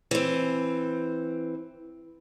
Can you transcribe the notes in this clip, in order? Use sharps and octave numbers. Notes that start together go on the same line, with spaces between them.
E3 C4